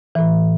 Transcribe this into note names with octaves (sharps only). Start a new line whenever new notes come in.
A2 E3